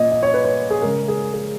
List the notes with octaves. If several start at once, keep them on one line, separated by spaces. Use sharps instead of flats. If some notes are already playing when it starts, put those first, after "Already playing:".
Already playing: A#2 D#5
D#5
C#5
B4
C#5
G#4
C#3 G#3 C#4 A#4
G#4
G#4